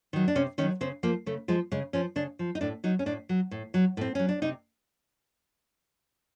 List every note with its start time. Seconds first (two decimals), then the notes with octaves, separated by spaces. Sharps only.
0.13 D#3 F#3
0.28 D4
0.35 C3 C#4
0.58 D#3 C#4
0.61 F#3
0.81 C#3 C4
1.03 F3 A#3
1.26 C#3 A3
1.48 F3 G#3
1.72 C#3 G#3
1.93 F3 C#4
2.16 C#3 D4
2.39 F3
2.55 D#4
2.61 A2 D4
2.84 F#3 D#4
2.99 C#4
3.06 A2 D4
3.29 F#3
3.51 A2
3.74 F#3
3.97 A2 C4
4.15 F#3 C#4
4.28 D4
4.42 C3 D#4